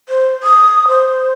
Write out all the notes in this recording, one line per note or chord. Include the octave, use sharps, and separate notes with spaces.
C5
D#6
C5